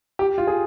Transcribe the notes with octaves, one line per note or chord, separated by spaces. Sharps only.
G4
F4
G#4